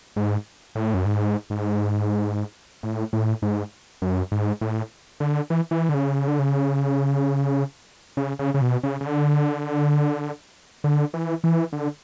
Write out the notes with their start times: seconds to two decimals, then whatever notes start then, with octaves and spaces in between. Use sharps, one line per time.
0.16 G#2
0.75 A2
0.94 F#2
1.05 G#2
1.50 G#2
2.83 A2
3.13 A2
3.42 G#2
4.02 F#2
4.32 G#2
4.61 A2
5.20 D3
5.50 E3
5.71 E3
5.89 D3
5.94 C#3
6.28 D3
6.39 C#3
8.17 C#3
8.39 C#3
8.54 C#3
8.61 B2
8.83 C#3
9.01 C#3
9.06 D3
10.84 D3
11.14 E3
11.44 E3
11.72 D3